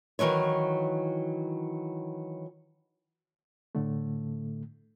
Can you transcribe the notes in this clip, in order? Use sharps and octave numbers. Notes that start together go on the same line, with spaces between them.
D#3 E3 F#3 C#5
A2 D3 A3